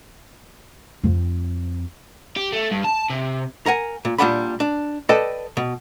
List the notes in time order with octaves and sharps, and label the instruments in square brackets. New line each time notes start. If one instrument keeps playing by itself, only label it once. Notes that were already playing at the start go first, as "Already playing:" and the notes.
[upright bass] F2 C4
[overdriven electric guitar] G4
A3
G2
A5
C3
[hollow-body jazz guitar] A#4 F#5 G#5
A#2
A#2 G3 C4 D4 F#5 B5
D4
A4 B4 D5 D#5 G5 A5
B2